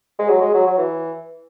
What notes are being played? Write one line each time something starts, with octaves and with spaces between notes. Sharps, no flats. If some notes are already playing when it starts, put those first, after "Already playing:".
G#3
F#3
G#3
F#3
F#3
E3